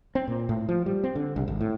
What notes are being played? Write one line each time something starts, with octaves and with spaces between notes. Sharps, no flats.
C4
A#2
A2
F3
G3
C4
D3
C2
G#1
A2